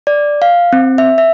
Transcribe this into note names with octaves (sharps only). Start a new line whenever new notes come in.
D5
F5
C4
E5
E5